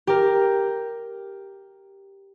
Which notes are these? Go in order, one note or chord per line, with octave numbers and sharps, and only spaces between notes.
G4 A#4